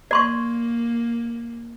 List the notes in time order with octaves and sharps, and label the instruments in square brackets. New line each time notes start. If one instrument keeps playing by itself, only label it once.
[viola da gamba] A#3 [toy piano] D5 C6 C#6